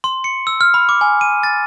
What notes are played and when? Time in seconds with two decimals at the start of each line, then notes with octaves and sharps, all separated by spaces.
0.04 C6
0.24 C#7
0.47 E6
0.61 F6
0.74 B5
0.89 D6
1.01 G#5
1.21 D#7
1.43 A6